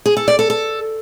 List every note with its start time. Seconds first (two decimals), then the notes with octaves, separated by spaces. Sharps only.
0.06 G#4
0.17 A4
0.28 D5
0.39 A4
0.50 A4